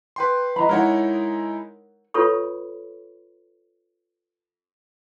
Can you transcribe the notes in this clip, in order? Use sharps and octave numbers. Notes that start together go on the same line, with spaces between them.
B4 G5 C6
D#5 A#5 B5
G#3 D#4 E4 A#4 C#5 F#5
F4 A4 B4 C#5 B5 C#6